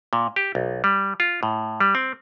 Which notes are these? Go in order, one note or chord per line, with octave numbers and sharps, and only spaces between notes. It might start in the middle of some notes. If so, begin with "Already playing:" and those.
A#2
G4
B1
G3
F4
A2
G3
C4